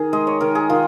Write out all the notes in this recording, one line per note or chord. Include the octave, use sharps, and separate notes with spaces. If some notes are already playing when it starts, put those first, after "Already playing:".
Already playing: D#3 G#4
G#3 D#5
C#5
D#3 A#4
G#4
D#3 F4